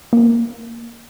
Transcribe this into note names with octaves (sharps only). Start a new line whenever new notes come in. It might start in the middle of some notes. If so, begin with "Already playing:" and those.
A#3